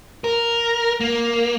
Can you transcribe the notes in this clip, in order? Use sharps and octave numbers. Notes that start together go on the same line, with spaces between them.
A#4
A#3